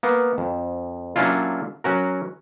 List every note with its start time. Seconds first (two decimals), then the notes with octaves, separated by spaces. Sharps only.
0.03 A#3 B3
0.38 F2
1.16 F#3 A#3 C#4 D4 E4 F4
1.84 F#3 C#4 F#4 A#4